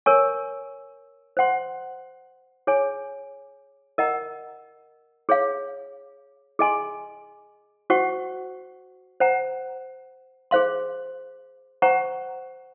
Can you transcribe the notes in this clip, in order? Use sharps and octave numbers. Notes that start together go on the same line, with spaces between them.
A#4 C#5 G#5 C#6
C5 F#5 C6
G#4 C#5 G#5
A#4 D#5 F#5 A#5
G#4 C#5 F5
G#4 D#5 G#5 C6
F#4 C5 F#5 C#6
C5 F#5 A#5
G#4 C5 F5 C6
C5 F#5 A#5 C#6